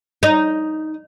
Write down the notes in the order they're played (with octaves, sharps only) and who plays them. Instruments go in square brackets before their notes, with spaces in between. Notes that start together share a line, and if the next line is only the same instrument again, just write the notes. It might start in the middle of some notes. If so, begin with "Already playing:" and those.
[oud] D#4